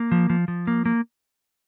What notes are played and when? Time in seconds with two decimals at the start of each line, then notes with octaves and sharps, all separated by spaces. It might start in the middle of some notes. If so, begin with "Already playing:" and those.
Already playing: A#3
0.12 F3
0.30 F3
0.48 F3
0.67 A#3
0.86 A#3